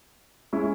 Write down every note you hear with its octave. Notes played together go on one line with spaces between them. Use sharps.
G#3 C#4 E4